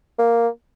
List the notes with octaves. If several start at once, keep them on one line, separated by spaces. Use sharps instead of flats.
A#3